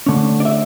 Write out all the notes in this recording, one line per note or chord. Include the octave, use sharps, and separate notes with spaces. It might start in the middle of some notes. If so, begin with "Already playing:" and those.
D3 A3 C#4
D5
E5